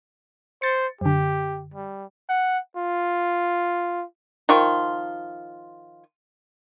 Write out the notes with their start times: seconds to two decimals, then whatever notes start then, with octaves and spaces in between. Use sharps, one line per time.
0.62 C5 A6 C#7
1.01 F#2 D3 G4
1.74 G3
2.29 F#5
2.77 F4
4.49 D#3 F3 F4 C#6